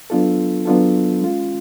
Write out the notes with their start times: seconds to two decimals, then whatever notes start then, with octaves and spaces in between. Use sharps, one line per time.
0.10 F#3 B3 D4 F4 A4
0.65 F#3 B3 D4 F4 A4
1.22 G#3 C#4 F4